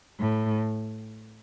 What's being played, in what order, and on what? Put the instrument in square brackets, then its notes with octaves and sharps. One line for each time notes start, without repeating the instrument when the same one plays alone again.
[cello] A2